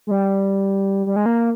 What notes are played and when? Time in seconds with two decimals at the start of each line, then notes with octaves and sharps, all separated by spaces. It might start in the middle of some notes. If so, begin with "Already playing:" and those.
0.07 G#3
0.11 G3
1.06 G3
1.16 G#3
1.26 A#3